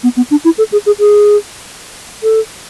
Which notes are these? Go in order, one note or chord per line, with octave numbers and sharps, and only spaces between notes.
B3
B3
D4
E4
A4
G#4
G#4
G#4
A4